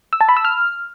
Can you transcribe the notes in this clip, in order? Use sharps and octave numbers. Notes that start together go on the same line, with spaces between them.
E6
A5
B5
E6
F6